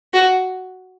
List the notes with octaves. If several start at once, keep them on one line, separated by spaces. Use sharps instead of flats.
F#4